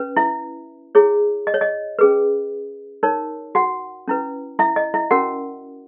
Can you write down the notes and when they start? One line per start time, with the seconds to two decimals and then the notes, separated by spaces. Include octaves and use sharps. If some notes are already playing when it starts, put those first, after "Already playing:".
Already playing: C#4 B4
0.17 E4 E5
0.95 E4 G#4 C#5
1.47 D#5
1.54 C#5
1.61 D#5
1.99 C#4 G#4 B4
3.03 D#4 A#4 C#5
3.55 F#4 F#5
4.08 C#4 E4 B4
4.59 E4 E5
4.76 D#5
4.94 E4 E5
5.11 C#4 F#4 A#4 F#5